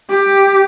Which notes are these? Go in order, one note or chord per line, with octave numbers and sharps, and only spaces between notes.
G4